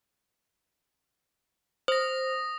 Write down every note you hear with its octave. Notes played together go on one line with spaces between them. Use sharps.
C5 D#6 A#6